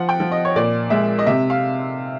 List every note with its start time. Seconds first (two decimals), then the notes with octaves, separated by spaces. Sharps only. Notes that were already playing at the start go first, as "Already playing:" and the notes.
Already playing: F3 F#5
0.09 G5
0.20 F3
0.32 D#5
0.45 C#5
0.56 A#2 D5
0.90 G#3 E5
1.19 D#5
1.27 C3 E5
1.50 F5